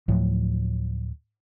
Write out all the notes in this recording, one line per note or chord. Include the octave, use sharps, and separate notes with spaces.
D2 A2 F3 F#3